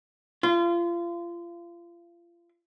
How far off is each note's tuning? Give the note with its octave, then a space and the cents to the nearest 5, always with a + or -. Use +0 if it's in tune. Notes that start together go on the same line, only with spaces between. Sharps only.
F4 -30